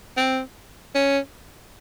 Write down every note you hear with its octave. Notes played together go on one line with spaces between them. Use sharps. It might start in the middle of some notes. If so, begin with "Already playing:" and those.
C4
C#4